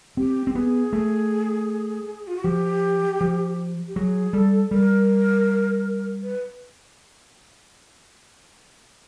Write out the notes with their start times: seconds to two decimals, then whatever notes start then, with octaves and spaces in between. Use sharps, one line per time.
0.17 C4 G4
0.47 C4
0.55 B3 G#4
0.93 A3
2.27 F4
2.36 F#4
2.44 F3 G4
3.21 F3
3.87 G4
3.96 F#3 G#4
4.33 G3 A4
4.71 G3 A#4
6.23 B4